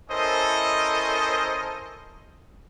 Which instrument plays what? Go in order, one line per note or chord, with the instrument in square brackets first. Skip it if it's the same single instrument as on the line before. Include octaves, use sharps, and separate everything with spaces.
[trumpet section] C#4 E4 A4 A#4 C5 D#5